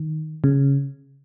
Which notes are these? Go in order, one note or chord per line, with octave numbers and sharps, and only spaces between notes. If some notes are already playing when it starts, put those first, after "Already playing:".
Already playing: D#3
C#3